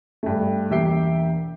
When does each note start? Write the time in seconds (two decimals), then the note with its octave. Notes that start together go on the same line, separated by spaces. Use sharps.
0.23 G2 A3
0.70 E1 A#3 G4 E5 G5 C7